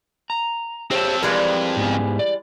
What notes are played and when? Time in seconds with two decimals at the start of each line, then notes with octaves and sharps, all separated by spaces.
0.30 A#5
0.91 C4 G4 A4 C5 C#5
1.23 F2 E3 G3 G#3 A#4 B4
1.77 G#2 B3 G#5
2.19 D5